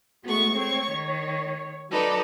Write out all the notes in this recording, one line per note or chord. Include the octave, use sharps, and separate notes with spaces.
G#3 A3 B3 F#4 C#6
C4 C#5 C#6
D#3
F#3 D#4 A4 B4 D5